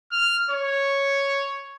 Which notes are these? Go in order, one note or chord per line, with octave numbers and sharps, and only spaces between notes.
F6
C#5